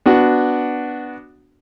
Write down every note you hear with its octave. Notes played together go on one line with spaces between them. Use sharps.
B3 D4 F#4